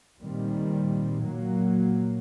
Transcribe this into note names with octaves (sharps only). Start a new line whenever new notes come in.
A#2 D#3 G3 C4
A#2 F#3 A#3